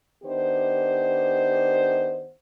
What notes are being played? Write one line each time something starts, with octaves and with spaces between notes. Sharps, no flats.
D#3 B3 D4 G4 C5